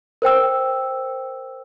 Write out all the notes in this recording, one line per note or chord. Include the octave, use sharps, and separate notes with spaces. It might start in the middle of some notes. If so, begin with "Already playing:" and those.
A#4 C5 G5 E6